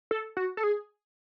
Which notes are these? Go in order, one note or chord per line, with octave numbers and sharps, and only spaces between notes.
A4
F#4
A4
G#4